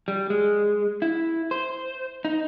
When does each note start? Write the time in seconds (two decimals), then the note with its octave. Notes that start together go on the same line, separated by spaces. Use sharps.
0.08 G3
0.30 G#3
1.02 E4
1.51 C5
2.25 D#4